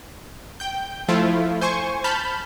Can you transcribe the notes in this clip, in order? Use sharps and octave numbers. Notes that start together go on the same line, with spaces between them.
G5 G6
F3 A3 E4 F4
C5 G#5 C#6
A5 B5 F6 G6